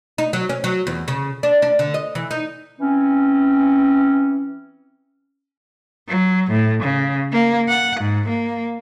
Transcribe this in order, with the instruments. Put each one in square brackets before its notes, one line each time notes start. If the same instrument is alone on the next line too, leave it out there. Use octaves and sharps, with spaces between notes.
[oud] D#4
F#3
C#4
F#3
E2
C#3
D4
D4
D3
D#5
E3
D#4
[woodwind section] E3 C4 C#4
[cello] F#3
A2
C#3
A#3
F#5
G#2
A#3